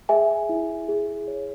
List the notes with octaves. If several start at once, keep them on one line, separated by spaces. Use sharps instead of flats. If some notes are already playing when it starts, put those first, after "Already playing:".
G#4 E5 G#5
E4
G#4
C#5